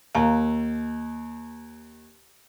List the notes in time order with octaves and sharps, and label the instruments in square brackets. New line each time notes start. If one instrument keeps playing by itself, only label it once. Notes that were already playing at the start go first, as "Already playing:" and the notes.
[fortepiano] D#2 [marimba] F5 A#5